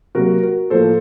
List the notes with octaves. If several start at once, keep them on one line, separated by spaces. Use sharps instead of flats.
C3 F#3 A#3 F#4 A#4
F#4 A#4
A2 F3 A#3 A4 C5